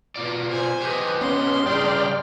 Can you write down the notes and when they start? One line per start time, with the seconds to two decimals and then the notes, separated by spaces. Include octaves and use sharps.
0.16 B2 F4 D5
0.49 C5 G#5
0.82 G4 B4 D#5
1.21 B3 C#4 C6
1.66 G2 C#3 G#3 D5 G5 F6